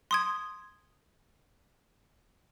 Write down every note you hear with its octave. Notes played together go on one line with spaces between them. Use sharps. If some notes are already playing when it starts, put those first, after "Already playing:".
C6 D#6 G#6